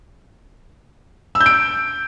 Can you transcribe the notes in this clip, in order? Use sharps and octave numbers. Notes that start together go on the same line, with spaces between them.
E6
G6
D7